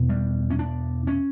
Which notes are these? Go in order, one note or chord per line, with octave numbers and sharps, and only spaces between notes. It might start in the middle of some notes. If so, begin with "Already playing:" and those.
Already playing: E2 B2
G3
C#4
D4
C#4